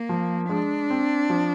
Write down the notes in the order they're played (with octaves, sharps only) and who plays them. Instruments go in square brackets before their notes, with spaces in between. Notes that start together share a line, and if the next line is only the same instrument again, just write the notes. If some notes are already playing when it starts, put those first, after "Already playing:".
Already playing: [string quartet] A#3
[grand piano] F3
[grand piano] G#3 [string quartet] D4
[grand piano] C4
F3